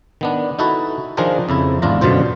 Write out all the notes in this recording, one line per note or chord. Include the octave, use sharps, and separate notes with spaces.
D#3 B3 D4
D#4 E4 F#4 A4 B4
D#3 F3 D4 G#4 A#4 C5
F2 C#3 E4
G#1 E2 D4 F4 A#5
F#2 B2 D3 F4 C5